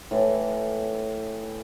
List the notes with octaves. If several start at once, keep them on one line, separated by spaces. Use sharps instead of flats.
A2 E3